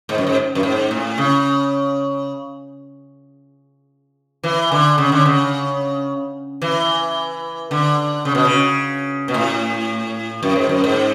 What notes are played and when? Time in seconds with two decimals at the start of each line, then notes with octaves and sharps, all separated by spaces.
0.09 G#2
0.18 F#2
0.27 G#2
0.55 F#2
0.63 G#2
0.91 A2
1.18 C#3
4.44 E3
4.72 D3
4.98 C#3
5.12 D3
5.25 C#3
6.62 E3
7.71 D3
8.25 C#3
8.35 B2
8.45 C#3
9.28 B2
9.34 A2
10.43 F#2
10.56 G#2
10.69 F#2
10.84 G#2